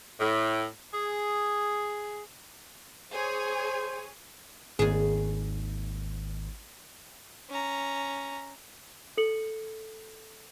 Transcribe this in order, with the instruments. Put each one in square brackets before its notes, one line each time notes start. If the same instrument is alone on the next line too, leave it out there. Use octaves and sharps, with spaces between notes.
[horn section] A2
G#4
[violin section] G#4 C#5 G#5 [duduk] C5
[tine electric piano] G#1 [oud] D#2 G#4
[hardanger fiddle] C#4 A#5
[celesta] A4 C#7 F#7